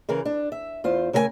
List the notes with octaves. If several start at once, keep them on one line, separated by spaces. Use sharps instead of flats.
C#3 E3 A#4
D4
E5
E2 F4 C5
C#3 A3 A#4 B4 G#5